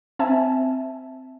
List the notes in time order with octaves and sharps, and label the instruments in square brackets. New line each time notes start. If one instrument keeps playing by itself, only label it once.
[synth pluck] C4 E5 G#5 A5